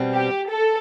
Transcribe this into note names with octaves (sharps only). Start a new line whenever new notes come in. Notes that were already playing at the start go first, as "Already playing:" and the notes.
Already playing: B2 G3 C4
G4
A4